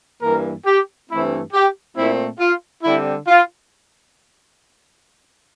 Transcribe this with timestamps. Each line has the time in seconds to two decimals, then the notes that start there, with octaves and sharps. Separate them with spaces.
0.22 G2 E3 A#3 A#4
0.66 G4
1.10 G2 E3 A3 C4 E4
1.53 G4
1.96 A#2 A3 C4 E4
2.39 F4
2.84 D3 G3 C4 E4
3.27 F4